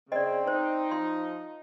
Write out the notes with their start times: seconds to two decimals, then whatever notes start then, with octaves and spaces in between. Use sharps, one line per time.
0.12 C#3 C4 D5 D#5
0.47 D#4 C5
0.91 F3 C6